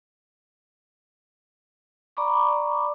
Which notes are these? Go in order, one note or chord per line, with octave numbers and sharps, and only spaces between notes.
D5 A#5 B5 C#6 D6